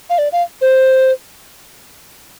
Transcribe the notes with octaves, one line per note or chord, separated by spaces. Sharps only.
F5
D5
F5
C5